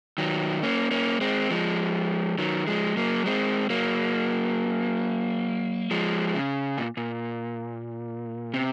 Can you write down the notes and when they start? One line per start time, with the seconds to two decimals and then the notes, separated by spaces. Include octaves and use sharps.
0.18 D#3 F#3
0.63 A#3 C#4
0.91 A#3 C#4
1.21 G#3 C4
1.51 F3 G#3
2.38 D#3 F#3
2.67 F3 G#3
2.97 F#3 A#3
3.26 G#3 C4
3.70 F#3 A#3
5.91 F3 G#3
6.35 C#3
6.78 A#2
6.97 A#2
8.54 C3